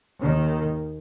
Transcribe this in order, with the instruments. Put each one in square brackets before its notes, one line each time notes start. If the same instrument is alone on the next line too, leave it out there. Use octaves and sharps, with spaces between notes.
[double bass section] D#2 D#3